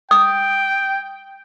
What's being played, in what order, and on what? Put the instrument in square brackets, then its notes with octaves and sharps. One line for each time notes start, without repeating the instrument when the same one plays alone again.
[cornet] G5 [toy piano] D#6